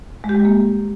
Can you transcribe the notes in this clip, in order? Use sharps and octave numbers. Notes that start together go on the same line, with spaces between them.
G#3
G4
G#3
G3
A#3